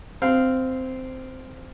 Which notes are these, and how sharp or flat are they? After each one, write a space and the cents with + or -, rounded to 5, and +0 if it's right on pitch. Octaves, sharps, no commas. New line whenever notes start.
C4 -10 F5 -5